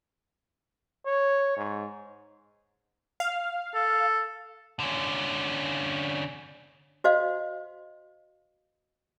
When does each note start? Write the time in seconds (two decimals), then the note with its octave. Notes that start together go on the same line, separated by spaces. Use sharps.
1.06 C#5
1.57 G#2
3.20 F5
3.75 A4
4.80 D3 C#4
7.04 F#4 C5 D#5 F5